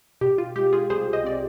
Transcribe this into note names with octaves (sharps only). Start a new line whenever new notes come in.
B2 G4
F4
G#3 G4
F4 G#4
C2 G#4 C5
C5 D#5
C4 D5